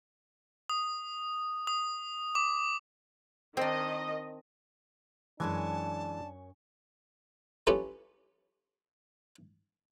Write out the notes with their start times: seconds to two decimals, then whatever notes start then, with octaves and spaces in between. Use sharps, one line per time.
0.70 D#6
1.67 D#6
2.35 D6
3.57 D#3 C4 D4 D#5
5.40 F#2 E3 G#3 D4 C#5 G#5 A5
7.67 C#4 E4 F4 G4 A4 B4